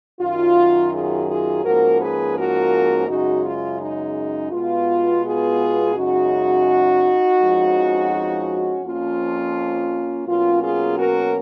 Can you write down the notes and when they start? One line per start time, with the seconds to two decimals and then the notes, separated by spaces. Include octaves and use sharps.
0.21 F#2 D#3 F#3 F4
0.92 F4 G#4
1.29 F4 G#4
1.64 G#2 F3 A#3 C#4 F#4 A#4
2.00 G#4 B4
2.36 F#4 A#4
3.08 F#2 C#3 G#3 D#4 F#4
3.44 F4
3.80 D#4
4.52 B2 G#3 B3 F4
5.24 F4 G#4
5.95 F#2 C#3 G#3 D#4 F#4
7.39 F2 F3 G#3 C#4
8.83 F2 F3 A#3 C#4 F4
10.27 B2 F#3 A#3 C#4 F4
10.62 F4 G#4
10.98 F#4 A#4